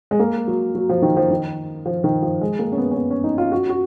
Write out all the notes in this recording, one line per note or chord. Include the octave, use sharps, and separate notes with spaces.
G#3
A#3
F#3
F#3
F3
D#3
F3
D#3
F3
D#3
F3
G#3
A#3
C#4
B3
C#4
B3
C#4
D#4
F4
F#4
F#4